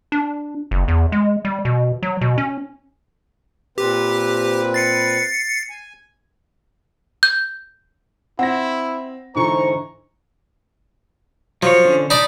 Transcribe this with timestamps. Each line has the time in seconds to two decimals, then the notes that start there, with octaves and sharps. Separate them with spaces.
0.12 D4
0.71 F#1
0.88 E2
1.12 G#3
1.45 G3
1.65 B2
2.03 F#3
2.21 B2
2.38 C#4
3.78 A#2 C4 G4 B4
4.74 A6 C7 C#7
5.70 G#5
7.23 G6
8.39 C4 E4 F#5 A#6
9.35 G#2 D3 E3 C5 A#5 C#6
11.63 F3 F#3 C#5
11.85 D3 C#4
12.10 D#4 D5 A5 B5